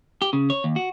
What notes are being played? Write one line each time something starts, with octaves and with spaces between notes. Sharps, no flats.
G4
C#3
C#5
D#2
F#4